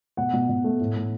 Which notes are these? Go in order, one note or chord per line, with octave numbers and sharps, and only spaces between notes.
B2 F#5
B2
B2
A3
A2
A2